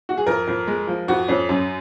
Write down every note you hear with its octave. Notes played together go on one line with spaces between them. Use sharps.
F#4
G#4
F2 A#4
F2
G#3
F3
F2 F#4
F2 C#4
F#2